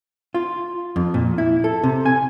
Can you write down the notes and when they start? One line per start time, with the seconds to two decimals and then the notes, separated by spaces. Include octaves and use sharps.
0.34 F4
0.96 F2
1.14 A#2
1.38 E4
1.64 A4
1.84 C3
2.06 G#5